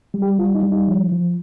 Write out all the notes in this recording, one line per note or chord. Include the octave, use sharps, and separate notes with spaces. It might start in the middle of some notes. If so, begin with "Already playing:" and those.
G3
G4
G3 F4
D#4
G3
D#4
F3
F3